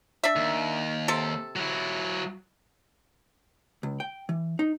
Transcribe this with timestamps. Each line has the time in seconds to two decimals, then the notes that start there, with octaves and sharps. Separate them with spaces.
0.24 D4 E5
0.36 D#2
1.08 C3 A4
1.56 F#3 E4
3.83 C#2
4.00 G5
4.29 E3
4.59 D#4